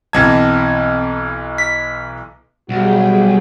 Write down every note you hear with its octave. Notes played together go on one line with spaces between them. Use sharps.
B1 E3 C4 D#5 A5 G#6
B6
B1 G3 F#4 G#4 G5